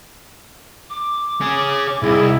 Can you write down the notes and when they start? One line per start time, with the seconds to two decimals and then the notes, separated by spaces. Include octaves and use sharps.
0.90 D6
1.41 C#4 G#4
2.03 C2 D#4 E4 G#4